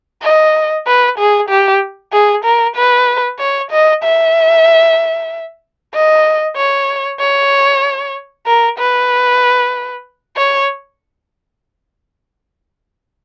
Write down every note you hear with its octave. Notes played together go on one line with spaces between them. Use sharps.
D#5
B4
G#4
G4
G#4
A#4
B4
C#5
D#5
E5
D#5
C#5
C#5
A#4
B4
C#5